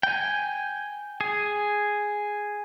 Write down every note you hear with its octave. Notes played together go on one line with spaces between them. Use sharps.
G5 G#5
G#4